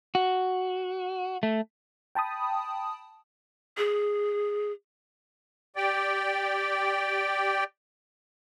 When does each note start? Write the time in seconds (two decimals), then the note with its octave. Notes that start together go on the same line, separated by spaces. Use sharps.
0.15 F#4
1.43 A3
2.15 G5 A5 B5 D#6
3.77 G#4
5.76 G4 D5 G5